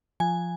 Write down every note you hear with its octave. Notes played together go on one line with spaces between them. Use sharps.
F3 G#5